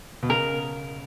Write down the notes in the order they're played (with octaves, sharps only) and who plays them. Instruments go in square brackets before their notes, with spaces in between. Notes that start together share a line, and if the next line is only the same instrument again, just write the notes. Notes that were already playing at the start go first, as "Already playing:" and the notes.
[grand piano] B2
[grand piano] C#3 [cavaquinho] A#4